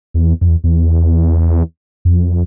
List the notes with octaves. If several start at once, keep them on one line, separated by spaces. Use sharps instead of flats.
E2
F2
E2
E2
F2